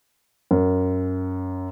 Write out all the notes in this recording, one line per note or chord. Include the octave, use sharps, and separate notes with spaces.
F#2